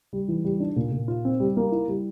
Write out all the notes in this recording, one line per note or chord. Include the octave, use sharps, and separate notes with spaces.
G3
E3
G3
D4
A#2
A#2
F4
C4
G3
A#3
E4
G3